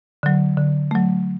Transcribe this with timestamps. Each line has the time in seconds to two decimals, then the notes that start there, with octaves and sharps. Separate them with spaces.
0.23 D3 F#3
0.57 D3
0.91 F#3 A3